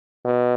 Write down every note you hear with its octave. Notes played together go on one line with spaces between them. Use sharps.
B2